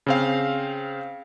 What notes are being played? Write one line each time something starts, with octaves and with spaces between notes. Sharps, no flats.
C#3 C4 F5